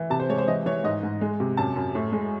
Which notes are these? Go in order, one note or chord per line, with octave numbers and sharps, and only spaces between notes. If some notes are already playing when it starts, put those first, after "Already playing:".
Already playing: E3
C3 A5
C5
G#3 C#5
C5
E3 D#5
E3 C#5
G#2 D#5
G#2
G#3
C3
F#2 A5
F#2
A2
G#3